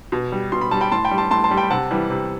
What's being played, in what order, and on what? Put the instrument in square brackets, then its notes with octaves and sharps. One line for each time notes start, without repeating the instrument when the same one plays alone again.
[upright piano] B2
G3
B2 C6
B5
G3 A5
G5 B5
A2 A5 C6
G5 B5
G3
A5 C6
A2 A5 C6
A5 C6
G3
G5 B5
C3 F#5 A5
E3 G3
C3